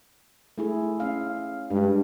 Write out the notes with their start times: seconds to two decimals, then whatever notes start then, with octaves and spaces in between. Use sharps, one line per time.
0.58 A3 E4 G#4
1.00 C#4 F5
1.70 G2 G#3